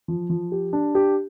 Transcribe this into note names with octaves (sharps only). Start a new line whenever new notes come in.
F3
F3
G4
D4
G4